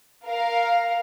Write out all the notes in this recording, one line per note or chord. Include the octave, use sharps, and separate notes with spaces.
A#4 F5